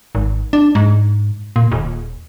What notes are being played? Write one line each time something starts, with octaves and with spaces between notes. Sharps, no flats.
G#1
D4
G#2
A#2
D#1